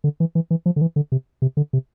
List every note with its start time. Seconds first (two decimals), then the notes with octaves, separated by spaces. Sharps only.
0.04 D3
0.20 E3
0.35 E3
0.51 E3
0.66 F3
0.76 D3
0.81 E3
0.96 D3
1.12 C3
1.42 C3
1.57 D3
1.73 C3